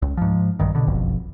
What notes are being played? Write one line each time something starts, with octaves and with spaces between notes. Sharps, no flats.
C#2
G#2 F3
A#1 G2 D#3
B2 D3
F#1 B1 F2